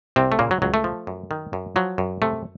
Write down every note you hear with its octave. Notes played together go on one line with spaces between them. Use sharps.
C2 C3 C4
A3
A#2 C#3 A#3
F#3
C#2 F#3
A3
F3
F#2
D#3
F#2
F3 F#3
F#2
C3 A3